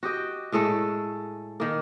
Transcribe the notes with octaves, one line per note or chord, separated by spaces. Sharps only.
F#4 G4 D#5 G5
A2 G#3 A3 A4
D#3 A#3